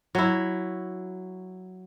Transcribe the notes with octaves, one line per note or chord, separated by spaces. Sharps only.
F#3 E4